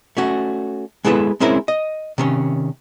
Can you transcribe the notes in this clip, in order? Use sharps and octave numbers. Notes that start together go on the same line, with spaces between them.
A3 C#4 F#4
G#3 B3 E4 A4 B4
G#3 C4 C#4 E4 A#4 E5
D#5
C3 D#3 C#4